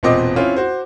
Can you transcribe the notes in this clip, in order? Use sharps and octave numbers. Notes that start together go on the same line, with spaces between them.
E1 A#2 B3 C4 D#5 D6
C4 C#4 E4 F4
F#4 C5